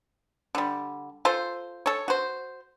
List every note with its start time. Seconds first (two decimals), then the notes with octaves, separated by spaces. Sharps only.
0.55 D3 G3
1.25 F4 A4 C5
1.86 A4 C#5
2.08 F#4 C5